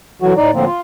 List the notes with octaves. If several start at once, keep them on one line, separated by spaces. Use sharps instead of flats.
D3 E3 F#3 F#4
A2 D#4 D5
A2 D3 F3 A#3 C4
F4